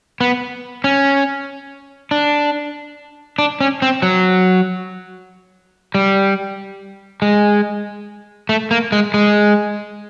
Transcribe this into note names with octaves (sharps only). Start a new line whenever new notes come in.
B3
C#4
D4
D4
C#4
C4
F#3
G3
G#3
A3
A#3
G#3
G#3